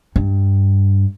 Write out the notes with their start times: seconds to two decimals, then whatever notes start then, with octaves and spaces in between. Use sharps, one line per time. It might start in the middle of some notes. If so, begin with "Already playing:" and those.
0.16 G2